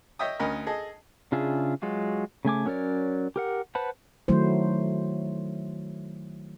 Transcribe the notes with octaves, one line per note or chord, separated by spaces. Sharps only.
C#5 D#5 E5 G5 D#6
D2 C#4 A#4 D#5 B5
G#4 A4 D#5
C#3 D4 F4 G#4 E5
F#3 G#3 F4 F#4
C#3 A3 G#5 D6
F#3 C#4 A#4 C#5 D5
G4 A#4 F#5
B4 C5 F#5 A5 B5
D#3 F#3 A3 E4 C5